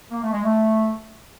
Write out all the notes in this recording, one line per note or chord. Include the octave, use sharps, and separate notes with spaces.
A#3
A3
G#3
A3